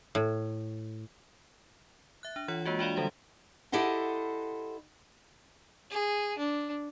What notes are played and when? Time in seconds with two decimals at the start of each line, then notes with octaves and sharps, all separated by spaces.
0.15 A2
2.23 E5 F#6
2.36 D4
2.48 E3 F4 C#5 F#5
2.65 G#3 A#3 F4 F#4
2.79 D4 F4 F#4 C#5 D5 F5
2.96 D3 E3 G3 G4 A6
3.72 E4 G4 A4 C5 D#5 F#5
5.90 G#4
6.38 D4